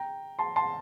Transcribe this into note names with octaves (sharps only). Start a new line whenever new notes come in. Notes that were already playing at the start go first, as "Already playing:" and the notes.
Already playing: G5 A#5
A5 C6
A5 C6